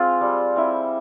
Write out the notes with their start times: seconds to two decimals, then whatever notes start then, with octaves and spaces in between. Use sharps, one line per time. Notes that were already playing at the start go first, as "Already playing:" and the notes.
Already playing: G#3 C4 F4
0.21 G3
0.56 C4 E4